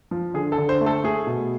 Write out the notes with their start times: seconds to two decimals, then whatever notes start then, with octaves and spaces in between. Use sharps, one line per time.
0.11 F3
0.34 D3 G#4
0.52 A4
0.58 D3
0.69 C5
0.81 A3
0.86 A4
1.04 A3 G#4
1.27 B2